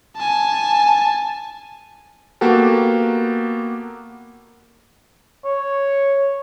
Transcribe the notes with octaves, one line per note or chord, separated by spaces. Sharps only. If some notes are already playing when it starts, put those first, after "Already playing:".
G#5 A5
A#3 B3 F#4 G4 A4
C#5